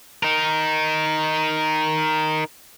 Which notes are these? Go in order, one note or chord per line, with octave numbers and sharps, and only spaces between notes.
D#4 A#4